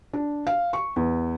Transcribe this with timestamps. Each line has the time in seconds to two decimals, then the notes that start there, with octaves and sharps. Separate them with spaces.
0.13 D4
0.47 F5
0.73 C#6
0.96 E2